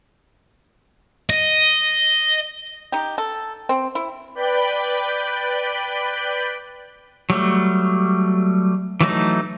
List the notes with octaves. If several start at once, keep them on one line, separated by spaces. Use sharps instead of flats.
D#5
D#4 G4
A4
C4
E4
B4 D5 G5 B5 G6
F#3 G3 A3
E3 F#3 A3 D#4